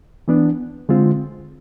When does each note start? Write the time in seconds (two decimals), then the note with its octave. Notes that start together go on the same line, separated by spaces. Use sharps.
0.28 E3 B3 D4
0.89 D3 G#3 C4 F4